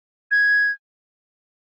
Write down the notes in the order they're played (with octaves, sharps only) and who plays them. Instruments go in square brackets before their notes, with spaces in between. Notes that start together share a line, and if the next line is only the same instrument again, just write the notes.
[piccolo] G#6